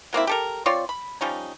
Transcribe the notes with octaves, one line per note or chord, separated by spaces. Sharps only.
F#3 A#3 C4 E4
G4 A4 A#4
C4 F4 C#5 D5
B5
F3 G3 C#4 D#4